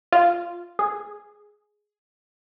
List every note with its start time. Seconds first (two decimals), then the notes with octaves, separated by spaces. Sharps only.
0.12 F4
0.79 G#4